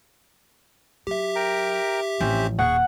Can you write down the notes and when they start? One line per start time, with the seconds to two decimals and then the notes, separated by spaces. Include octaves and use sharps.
1.07 F#3 G4 E5
1.35 A#4 G5 A#5
2.20 A1 F3 C4 C#4 C5
2.59 D#1 G#4 F#5 C#6